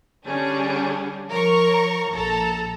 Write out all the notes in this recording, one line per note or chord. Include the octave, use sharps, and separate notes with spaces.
D3 G3 C#4 D4 G#4
F3 A#4 C#5 A#5 C#6
A#1 A4 A#5